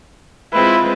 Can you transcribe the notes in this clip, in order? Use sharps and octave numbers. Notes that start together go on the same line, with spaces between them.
G#3 C4 E4 F4 B4